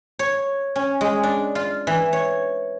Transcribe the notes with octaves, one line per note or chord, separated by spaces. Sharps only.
C#5
C#4
G#3
D4
F4
E3
C#5